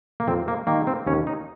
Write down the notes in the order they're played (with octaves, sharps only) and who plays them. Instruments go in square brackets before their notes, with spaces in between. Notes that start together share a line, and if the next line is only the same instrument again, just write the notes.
[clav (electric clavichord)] A#3
F2 C4
A#3
D#3 G3 A#3
C4
D#2 C#4
D#4